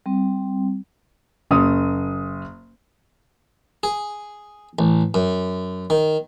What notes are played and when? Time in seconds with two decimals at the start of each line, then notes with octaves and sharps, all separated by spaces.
0.06 G3 C4
1.51 F#1 D#6
3.83 G#4
4.79 A1
5.14 F#2
5.90 D#3